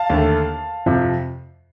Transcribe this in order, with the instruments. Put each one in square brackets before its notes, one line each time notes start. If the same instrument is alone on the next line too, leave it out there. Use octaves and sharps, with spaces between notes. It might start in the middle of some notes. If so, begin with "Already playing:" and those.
Already playing: [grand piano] F5 A5
D#2 D3 A3
F2 C3 F3